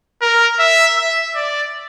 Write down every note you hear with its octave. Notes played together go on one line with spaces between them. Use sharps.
A#4
E5
E5
D5